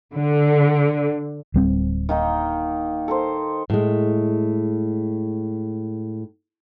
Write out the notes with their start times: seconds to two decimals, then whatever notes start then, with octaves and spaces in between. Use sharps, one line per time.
0.14 D3
1.54 D1 G3 C4
2.09 D#3 A#3 D#4
3.08 A4 A#4 C5
3.70 A2 G#3